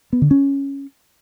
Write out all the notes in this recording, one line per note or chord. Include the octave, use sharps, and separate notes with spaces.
B3
D3
C#4